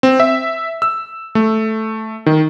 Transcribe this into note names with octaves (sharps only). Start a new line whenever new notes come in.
C4
E5
E6
A3
D#3